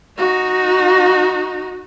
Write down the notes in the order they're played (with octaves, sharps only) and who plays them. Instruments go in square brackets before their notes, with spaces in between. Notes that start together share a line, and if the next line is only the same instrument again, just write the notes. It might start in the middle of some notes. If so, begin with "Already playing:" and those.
[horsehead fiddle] D#4 F#4